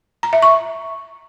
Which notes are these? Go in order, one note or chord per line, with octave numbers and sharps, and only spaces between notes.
A#5
E5
C#6